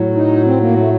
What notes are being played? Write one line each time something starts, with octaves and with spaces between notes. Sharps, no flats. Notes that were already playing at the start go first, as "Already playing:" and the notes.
Already playing: A2 F#3
D#4
C4
A#3
A3